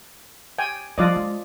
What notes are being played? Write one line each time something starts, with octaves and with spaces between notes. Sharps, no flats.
G5 G#5
F3 G3 F4 D5 D#5
G#3